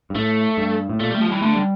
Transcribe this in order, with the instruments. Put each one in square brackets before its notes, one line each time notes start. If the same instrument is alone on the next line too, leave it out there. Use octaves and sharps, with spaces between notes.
[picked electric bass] G2
[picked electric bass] A2 [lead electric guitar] A3
[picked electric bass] G2
A2
[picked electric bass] A#2 [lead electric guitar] A3
[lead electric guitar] G3
[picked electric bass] A3
[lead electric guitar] F3
[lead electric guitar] E3 [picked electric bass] G3
[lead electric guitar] D3 [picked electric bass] A3
[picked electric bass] G3